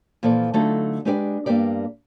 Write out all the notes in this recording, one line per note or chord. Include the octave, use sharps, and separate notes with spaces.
A#2 E3 F3 A4 D5
D3 F#3 A3 D#4 F4 A4
G#3 D4 G4 B4 C#5 D5
G2 A#3 B3 G4 D5